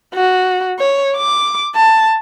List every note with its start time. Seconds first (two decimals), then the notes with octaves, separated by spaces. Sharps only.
0.15 F#4
0.79 C#5
1.17 D6
1.75 A5